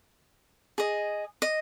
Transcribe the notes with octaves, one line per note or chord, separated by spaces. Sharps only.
G#4 D#5
D#5